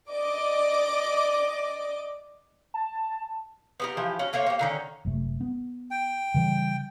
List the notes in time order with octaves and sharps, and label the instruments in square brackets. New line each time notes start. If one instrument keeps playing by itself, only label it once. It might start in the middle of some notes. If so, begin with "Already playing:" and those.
[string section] D5 D#5 D6
[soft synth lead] A5
[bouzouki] B3 G4 A#4
E3 F3 G4
C#4 F#4
A3 A#3 C5 C#5
A#3 G4
D3 D#3 C#4
[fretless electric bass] F#1 C3 A3
B3
[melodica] G5
[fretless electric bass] C#3 E3 G3